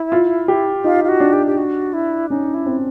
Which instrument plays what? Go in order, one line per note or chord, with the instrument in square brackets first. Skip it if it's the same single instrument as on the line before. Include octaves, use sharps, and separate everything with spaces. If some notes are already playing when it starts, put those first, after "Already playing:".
Already playing: [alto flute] E4
[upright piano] F4
G4
[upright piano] D#4 [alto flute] F4
[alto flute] F4
F#4
[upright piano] D4
[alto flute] G4
G4
F#4
E4
[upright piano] C#4 [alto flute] D#4
[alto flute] E4
[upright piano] C4